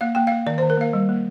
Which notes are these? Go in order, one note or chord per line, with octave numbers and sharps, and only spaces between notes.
A#3 F5
A#3 G5
A#3 F5
D#3 D5
D#3 C5
A#4
A#3 F5
G3
A#3